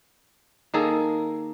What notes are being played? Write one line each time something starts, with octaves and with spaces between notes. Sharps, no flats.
D#3 A#3 G#4 A4